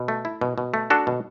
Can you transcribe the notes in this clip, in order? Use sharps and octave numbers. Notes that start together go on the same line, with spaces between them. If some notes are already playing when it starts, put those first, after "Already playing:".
Already playing: B2
A3
E4
B2
B2
A3
D4 F#4 A4
B2